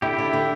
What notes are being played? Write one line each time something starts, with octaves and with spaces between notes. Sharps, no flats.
D3 E4 G4
D3
D3